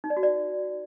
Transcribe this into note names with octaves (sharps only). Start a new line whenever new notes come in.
D#4
D5
F#4
D5